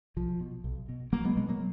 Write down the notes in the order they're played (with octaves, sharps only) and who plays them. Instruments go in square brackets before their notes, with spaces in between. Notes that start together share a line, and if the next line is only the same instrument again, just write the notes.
[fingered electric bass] B1 F3
B2
B1
B2
B1 F#3 A#3
G#3 B3
B2 G#3 B3
F#3 A#3